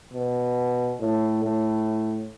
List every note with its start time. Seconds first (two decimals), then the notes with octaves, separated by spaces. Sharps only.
0.14 B2
1.00 A2
1.43 A2